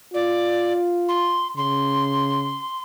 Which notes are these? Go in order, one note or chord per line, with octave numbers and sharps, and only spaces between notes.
F4 D5
C6
C#3 C6